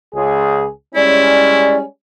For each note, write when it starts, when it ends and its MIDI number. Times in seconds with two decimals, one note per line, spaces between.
0.14 0.66 37
0.14 0.66 68
0.95 1.82 55
0.95 1.82 56
0.95 1.82 61
0.95 1.77 64
0.95 1.77 74